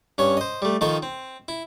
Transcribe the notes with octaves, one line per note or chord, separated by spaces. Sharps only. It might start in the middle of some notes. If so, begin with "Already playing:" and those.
G2 C#4 C#5
C5 D#5
G3 A3
D#3 F3 D#4 A4 D#5 C#6
C4
E4